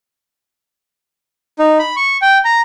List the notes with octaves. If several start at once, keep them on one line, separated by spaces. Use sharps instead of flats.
D#4
B5
C#6
G5
A#5